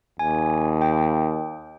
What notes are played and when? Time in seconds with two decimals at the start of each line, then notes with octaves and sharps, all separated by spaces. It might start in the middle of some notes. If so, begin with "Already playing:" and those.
0.19 D#2 G#5
0.82 G5